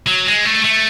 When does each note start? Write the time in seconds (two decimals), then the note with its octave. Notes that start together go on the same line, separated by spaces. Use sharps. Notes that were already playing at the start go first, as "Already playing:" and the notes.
0.07 F#3
0.27 G#3
0.45 A3
0.64 A3